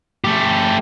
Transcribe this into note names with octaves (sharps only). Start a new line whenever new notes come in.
A3 G4